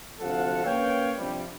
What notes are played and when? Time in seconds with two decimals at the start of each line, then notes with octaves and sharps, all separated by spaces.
0.20 D2 C3 F3 A4 F5 F#5
0.65 A#3 C#4 B4 C#5 F5 G5
1.17 G2 C3 F3 G3